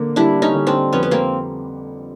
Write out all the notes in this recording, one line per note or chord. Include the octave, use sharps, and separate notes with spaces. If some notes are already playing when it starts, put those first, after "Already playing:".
Already playing: D3 A#3
G3 D4 E4
C#4 D#4
D3
C4 D4
F2 B3 C#4
B3
A#3 C4